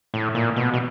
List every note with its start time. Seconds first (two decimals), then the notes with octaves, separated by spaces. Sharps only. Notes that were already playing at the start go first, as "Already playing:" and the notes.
0.14 A2
0.35 A#2
0.56 B2
0.74 B2